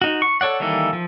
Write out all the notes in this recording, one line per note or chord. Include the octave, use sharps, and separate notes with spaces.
D#4 F#4
C#6
A4 C#5 D5 F#5
D#3 E3 G3 A#3 A4
F3